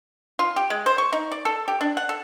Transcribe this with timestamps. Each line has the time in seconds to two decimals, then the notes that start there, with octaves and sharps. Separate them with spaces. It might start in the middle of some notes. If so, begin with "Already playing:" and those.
0.39 F4
0.56 G4
0.70 G#3
0.86 C5
0.98 C#6
1.13 D#4
1.32 D5
1.45 A4
1.68 G4
1.81 D4
1.97 F#5
2.09 A4